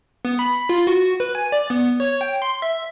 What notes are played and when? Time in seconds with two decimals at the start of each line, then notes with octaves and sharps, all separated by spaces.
0.25 B3
0.39 B5
0.69 F4
0.87 F#4
1.20 B4
1.35 G#5
1.52 D5
1.70 B3
2.00 C#5
2.21 G5
2.42 C6
2.62 E5